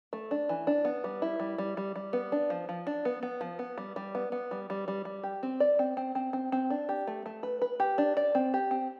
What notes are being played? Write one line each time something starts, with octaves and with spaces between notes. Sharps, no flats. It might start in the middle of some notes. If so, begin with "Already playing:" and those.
A3
D4
E3
D4
B3
G3
E4
G3
G3
G3
G3
B3
D4
F3
F3
D4
B3
B3
F3
B3
G3
G3
B3
B3
G3
G3
G3
G3
G4
C4
D5
C4
C4
C4
C4
C4
D4
G4
A3
A3
B4
B4
G4
D4
D5
C4
G4
C4